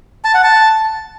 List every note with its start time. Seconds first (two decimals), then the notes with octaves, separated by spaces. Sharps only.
0.24 A5
0.34 F#5
0.44 A5